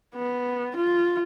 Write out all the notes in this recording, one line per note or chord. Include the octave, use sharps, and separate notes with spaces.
B3
F4